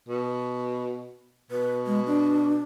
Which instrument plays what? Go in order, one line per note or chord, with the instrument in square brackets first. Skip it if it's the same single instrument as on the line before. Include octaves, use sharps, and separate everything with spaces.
[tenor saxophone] B2
[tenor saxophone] B2 [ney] B4
[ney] G#3
D4